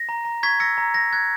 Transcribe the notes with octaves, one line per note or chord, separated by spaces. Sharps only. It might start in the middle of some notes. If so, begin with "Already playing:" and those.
Already playing: A#6
A#5
A#5
C#6 G#6 B6
E6 A#6 C#7
A#5 A#6
A#5 A#6
F#6 G#6